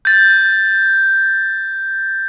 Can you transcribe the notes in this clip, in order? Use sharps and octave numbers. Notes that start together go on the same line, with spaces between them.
G6 A6